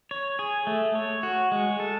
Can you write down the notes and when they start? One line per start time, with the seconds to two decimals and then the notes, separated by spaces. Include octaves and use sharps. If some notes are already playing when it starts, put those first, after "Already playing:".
0.11 C#5
0.39 G#4
0.67 A3
0.95 C#5
1.23 F#4
1.52 G#3
1.80 A4